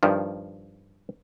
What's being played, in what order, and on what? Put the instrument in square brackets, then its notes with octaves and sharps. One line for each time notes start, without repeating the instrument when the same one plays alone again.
[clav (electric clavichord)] G2 D#3 F3